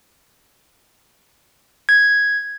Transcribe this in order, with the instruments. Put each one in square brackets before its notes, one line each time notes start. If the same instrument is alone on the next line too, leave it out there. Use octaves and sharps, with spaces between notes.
[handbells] G#6